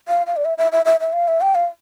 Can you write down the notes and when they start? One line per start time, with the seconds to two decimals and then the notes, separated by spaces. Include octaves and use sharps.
0.08 F5
0.27 F5
0.37 D5
0.45 E5
0.58 E5
0.72 E5
0.86 E5
1.00 E5
1.13 F5
1.28 E5
1.41 G5
1.55 F5